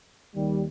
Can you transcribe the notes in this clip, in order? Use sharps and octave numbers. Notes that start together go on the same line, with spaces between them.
D#2 D#3 G3